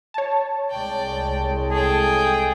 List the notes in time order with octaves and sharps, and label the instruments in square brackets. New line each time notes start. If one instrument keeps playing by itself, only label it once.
[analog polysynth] C#5 A5
[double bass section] C2 G#3 [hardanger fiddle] D5 G5
[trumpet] G#4 [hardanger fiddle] A4 G5